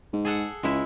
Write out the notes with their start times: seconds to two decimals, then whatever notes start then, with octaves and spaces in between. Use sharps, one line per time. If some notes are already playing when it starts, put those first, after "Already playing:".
0.13 G#2
0.25 G#4 A4 F#5
0.63 C#2 G#3 E4